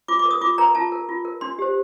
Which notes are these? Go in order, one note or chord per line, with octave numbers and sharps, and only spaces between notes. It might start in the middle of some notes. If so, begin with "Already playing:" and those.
F4 D6
D6
A#4
D#6
F4 D6
A#4 A#5
F4 A5
A#4
F4
A#4
D4 C6
G4 C5